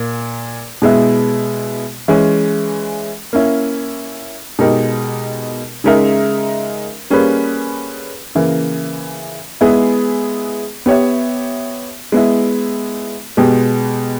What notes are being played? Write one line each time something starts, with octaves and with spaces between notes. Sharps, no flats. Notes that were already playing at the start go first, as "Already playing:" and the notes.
Already playing: A#2 A#3
B2 G#3 B3 E4
E3 G#3 C#4
A#3 C#4 E4
B2 G#3 D#4 G4 A#4
C#3 G#3 D#4 A#4 E5
G3 A#3 C#4 G#4 B4
C#3 E3 A#3
G#3 B3 E4 G#4
B3 G4 C#5 E5
G#3 B3 E4
B2 G#3 B3 G4